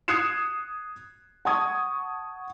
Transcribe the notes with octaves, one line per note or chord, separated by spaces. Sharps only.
D#6 F#6 G#6 C7 C#7 E7
F#5 A5 C#6 D#6 G#6